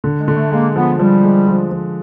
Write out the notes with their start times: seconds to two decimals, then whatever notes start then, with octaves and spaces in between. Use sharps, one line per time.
0.04 D3
0.19 G#3
0.28 D3
0.35 A3
0.51 G#3 A#3
0.76 F3 B3
0.99 F3 G3
1.24 G#3
1.47 F3
1.71 F3